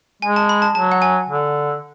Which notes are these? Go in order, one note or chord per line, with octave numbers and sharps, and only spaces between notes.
G#3 G#5
A5
B5
A5
F#3 A5
F#5
G#5
D3